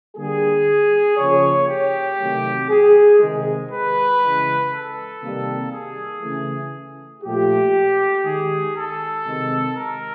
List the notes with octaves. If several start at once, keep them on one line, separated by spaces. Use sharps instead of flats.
D3 G3 A#3 G#4
C#3 F3 A#3 C#5
G4
C3 D#3 F#3 A3
G#4
C3 D#3 G#3
B4
C#3 E3 G#3
A4
C3 D#3 G3 A#3
G#4
C#3 E3 A3
A#2 F3 A3 G4
D#3 G#3 G#4
A4
C3 D#3 G#3
A#4